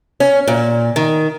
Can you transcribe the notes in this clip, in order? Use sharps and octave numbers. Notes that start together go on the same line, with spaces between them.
C#4
A#2
D#3